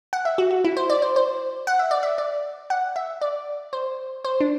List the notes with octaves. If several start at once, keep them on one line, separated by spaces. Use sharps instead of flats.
F#5
E5
F#4
F#4
E4
C5
D5
C5
C5
F#5
E5
D5
E5
D5
F#5
E5
D5
C5
C5
D4